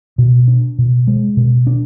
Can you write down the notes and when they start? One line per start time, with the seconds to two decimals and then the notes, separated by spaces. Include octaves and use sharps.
0.18 B2
0.48 D4
0.78 B2
1.07 G#3
1.37 B2
1.67 D4